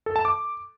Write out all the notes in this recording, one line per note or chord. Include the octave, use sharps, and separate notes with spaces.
A4
A5
D6